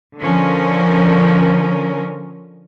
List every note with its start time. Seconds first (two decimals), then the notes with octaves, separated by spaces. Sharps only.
0.19 D3 F3 C#4 A#4